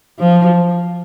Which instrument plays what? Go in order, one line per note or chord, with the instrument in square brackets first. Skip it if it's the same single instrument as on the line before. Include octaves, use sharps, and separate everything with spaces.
[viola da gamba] F3